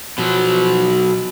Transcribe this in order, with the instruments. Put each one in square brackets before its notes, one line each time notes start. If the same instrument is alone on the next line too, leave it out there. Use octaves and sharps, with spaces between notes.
[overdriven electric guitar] B2 F#3 [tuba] F3